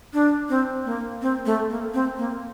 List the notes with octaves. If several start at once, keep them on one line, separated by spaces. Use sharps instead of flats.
D4
C4
A#3
C4
A3
A#3
C4
A#3